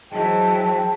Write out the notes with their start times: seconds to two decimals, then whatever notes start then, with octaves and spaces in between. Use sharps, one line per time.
0.11 E3 F#3 G#3 C5 G5 A5